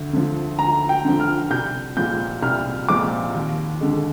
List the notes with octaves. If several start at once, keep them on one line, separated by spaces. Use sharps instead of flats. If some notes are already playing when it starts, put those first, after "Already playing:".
Already playing: D2
D3 F3
D2 A#5
G5
D3 F3
F6
C2 G6
A#2 F3 G#3 G6
C2 F6
A#2 F3 G#3 D6
D#2
D3 G#3